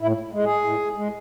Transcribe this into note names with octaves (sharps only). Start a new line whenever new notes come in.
A2 E4
G#3
G#4
A2
G#3